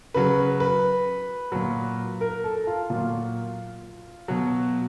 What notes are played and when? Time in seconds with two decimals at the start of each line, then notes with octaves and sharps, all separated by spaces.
0.14 C#3 F#3 B4
0.60 B4
1.52 A#2 F#3
2.21 A#4
2.44 A4
2.67 F4
2.90 A#2 F#3 F4
4.28 B2 F#3